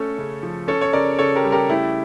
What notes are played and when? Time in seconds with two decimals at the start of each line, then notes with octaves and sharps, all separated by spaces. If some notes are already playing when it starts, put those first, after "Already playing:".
Already playing: A3 C#4 A4 C#5
0.18 C#3
0.43 F3
0.68 C#4 A4 C#5
0.81 C#5
0.93 C#3 A#4 D5
1.19 C#3 A4 C#5
1.35 G4 A#4
1.44 G3
1.52 G4 A#4
1.69 A3 E4 G4